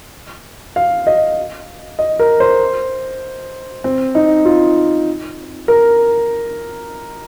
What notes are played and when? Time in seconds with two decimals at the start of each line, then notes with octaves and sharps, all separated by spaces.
0.76 F5
1.07 D#5
1.99 D#5
2.19 A#4
2.40 C5
3.84 C4
4.15 D#4
4.45 F4
5.68 A#4